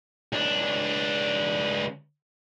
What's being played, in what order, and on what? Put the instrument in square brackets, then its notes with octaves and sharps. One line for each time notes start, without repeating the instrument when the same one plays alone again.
[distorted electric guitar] C#2 D4